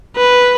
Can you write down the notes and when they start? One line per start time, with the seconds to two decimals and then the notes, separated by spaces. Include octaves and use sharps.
0.17 B4